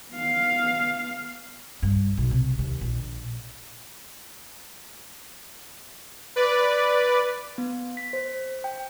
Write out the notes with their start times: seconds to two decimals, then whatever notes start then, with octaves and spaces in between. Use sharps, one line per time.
0.11 B3 F5
1.82 G2
2.17 B1
2.31 C3
2.58 D#2
2.81 A#1
6.36 B4 D5
7.58 B3
7.97 B6
8.13 C5
8.64 G5